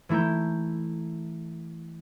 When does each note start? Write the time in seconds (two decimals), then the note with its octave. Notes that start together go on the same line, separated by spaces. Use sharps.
0.09 E3 A3 E4 A#5 G6